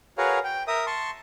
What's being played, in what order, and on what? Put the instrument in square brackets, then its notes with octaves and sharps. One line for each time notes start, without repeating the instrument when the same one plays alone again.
[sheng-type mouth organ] F#4 G#4 A#4 B4 C#5 F5
G5
A#4 E5 D#6
A5 C6 C#6